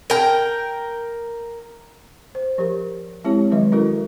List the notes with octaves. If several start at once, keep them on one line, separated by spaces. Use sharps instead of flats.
A#4 G5
C5
F3 G4 A#4
G#3 C4 E4 G4 C#5
D#3 F3 F#3 G#3 B4 D#5
C#4 E4 F#4 A4 A#4